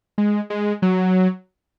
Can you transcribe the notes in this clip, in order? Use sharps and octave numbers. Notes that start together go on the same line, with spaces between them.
G#3
G#3
F#3